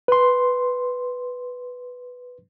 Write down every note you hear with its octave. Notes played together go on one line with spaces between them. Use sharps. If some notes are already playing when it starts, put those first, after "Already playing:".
B4 C6